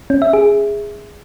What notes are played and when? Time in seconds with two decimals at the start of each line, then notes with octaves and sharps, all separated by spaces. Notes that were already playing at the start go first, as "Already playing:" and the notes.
0.10 C#4
0.22 E5
0.33 G#4